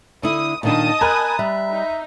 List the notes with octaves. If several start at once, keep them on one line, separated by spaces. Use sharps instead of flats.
D3 E4 D#6
A#2 D#3 D4 D#5 A5 D#6
A#4 G#5 A#5 B5 F#6
G3 E5
D#4